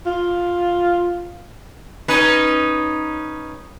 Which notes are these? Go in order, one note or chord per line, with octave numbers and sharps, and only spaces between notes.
F4
C#4 D#4 B4